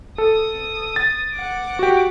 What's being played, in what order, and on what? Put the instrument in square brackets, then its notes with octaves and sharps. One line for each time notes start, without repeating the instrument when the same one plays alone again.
[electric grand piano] A4 [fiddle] D#6
[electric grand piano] A6
[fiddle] F#5 D6
[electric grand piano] F#4 G4